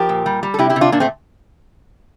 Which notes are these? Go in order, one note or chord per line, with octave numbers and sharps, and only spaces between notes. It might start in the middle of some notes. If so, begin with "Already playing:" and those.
Already playing: F3 G4 A#4
A#2
G3
G3
A4
C3 E4 G4
E4 G4
C3
D4 F4
A#2 A#3 D4
A3 C4